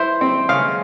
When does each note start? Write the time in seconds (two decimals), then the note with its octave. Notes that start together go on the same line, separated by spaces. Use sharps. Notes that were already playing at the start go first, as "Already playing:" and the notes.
Already playing: E4 C5
0.21 C4
0.49 C#3 F5